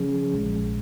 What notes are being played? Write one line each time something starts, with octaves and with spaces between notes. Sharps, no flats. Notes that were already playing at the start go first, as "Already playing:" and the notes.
Already playing: C#3 F3 C#4 G#4
A#1 A#2 G#3